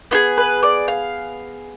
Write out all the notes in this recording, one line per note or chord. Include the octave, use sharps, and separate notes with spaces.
B3 F4 G#4
B4
D5
F5